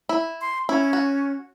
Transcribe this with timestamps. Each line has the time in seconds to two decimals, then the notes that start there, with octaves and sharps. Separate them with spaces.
0.09 E4
0.41 C6
0.69 C#4 E4
0.93 F#4